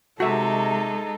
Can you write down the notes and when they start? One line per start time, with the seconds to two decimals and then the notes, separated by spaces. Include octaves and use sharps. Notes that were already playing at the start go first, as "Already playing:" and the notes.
0.20 C3 G#3 D#4 F#4 A4 E5